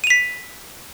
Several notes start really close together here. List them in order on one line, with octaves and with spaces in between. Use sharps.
D#7 F7 B6